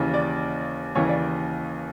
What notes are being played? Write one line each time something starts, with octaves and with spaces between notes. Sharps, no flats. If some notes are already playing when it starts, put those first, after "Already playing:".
Already playing: D#2 C#3 E3
D5
D#2 C#3 E3 C#5
D5